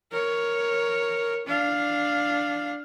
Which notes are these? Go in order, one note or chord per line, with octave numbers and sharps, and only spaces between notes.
A#4 C#5
D4 F5